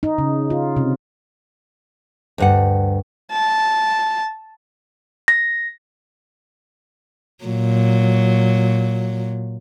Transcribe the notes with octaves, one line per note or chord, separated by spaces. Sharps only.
D#4
C#3
F4
C3
D2 G2 F#5
A5
A#6
A#2 F#3